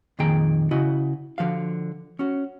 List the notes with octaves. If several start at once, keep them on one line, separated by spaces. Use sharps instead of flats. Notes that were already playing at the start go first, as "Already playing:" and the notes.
F2 A#2 D#3 G#4 G5 A#5
C#3 E4 F#4 D#5
D3 F3 F#4 F5
C#4 F#4